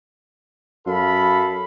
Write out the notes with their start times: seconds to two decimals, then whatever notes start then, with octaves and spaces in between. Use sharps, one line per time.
0.86 F#2 A4 F5 B5